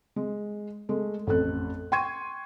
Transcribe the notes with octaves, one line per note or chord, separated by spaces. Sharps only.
G#3
G#3 A3
A1 F2 A3 A4 F#6
G5 C6 C#6 G#6 D#7